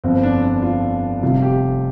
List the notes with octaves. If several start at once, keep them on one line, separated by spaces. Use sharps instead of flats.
G1 F2 F3 C4
D4
D4
F4
F1 F2 C3 G3 F4
G4